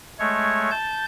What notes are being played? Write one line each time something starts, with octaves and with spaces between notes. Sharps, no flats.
G#3 A3 C#5
A5 G6